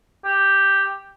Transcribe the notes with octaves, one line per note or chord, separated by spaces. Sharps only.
G4